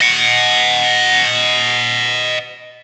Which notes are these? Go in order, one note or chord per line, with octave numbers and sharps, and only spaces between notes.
D#5 F#5